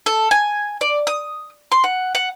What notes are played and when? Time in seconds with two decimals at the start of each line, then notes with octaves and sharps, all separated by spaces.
0.06 A4
0.31 G#5
0.81 D5
1.07 D#6
1.72 C6
1.84 F#5
2.15 F#5